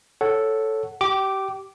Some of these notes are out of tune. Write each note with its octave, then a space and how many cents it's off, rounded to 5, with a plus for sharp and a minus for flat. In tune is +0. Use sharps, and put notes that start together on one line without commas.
A4 +0 C#5 +0 F#5 +0
G4 -25 D6 +0